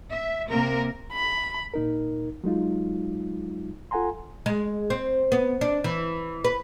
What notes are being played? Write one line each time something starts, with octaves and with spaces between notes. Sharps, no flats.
E5
C3 A#3 A#4
B5
A#2 D#4 A#4
F#3 G#3 D#4 F4
F4 A4 F#5 G#5 A#5 C6
G#3
C4
B3
D4
E3
B4